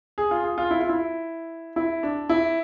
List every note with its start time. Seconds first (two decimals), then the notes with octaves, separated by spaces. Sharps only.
0.18 G#4
0.31 F4
0.44 G#4
0.58 F4
0.71 E4
0.81 F4
0.89 E4
1.76 E4
2.03 D4
2.29 E4